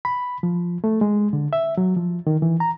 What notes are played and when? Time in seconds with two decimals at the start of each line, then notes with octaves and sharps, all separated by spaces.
0.05 B5
0.43 F3
0.84 A3
1.01 G#3
1.33 D3
1.53 E5
1.77 F#3
1.96 F3
2.27 D#3
2.42 E3
2.60 A#5